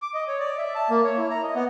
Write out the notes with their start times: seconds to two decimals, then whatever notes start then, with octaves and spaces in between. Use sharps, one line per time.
0.02 D6
0.14 D#5
0.28 C#5
0.40 D5
0.58 E5
0.75 A5
0.90 A#3
1.04 C#5
1.18 E4
1.31 A#5
1.43 D#5
1.55 B3